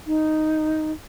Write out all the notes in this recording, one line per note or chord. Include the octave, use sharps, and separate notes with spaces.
D#4